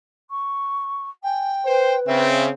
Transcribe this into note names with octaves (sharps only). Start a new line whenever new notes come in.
C#6
G5 G#5
B4 C5
C#3 C4 E5